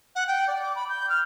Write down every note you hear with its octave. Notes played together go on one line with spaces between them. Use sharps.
F#5
G5
D5
D6
B5
G6
F6